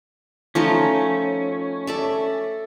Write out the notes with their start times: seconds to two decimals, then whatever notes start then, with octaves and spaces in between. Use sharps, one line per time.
0.55 F3 A3 C#4 D#4
1.87 A4 D5 E5